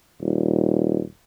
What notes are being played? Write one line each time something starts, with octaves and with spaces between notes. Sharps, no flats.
D#1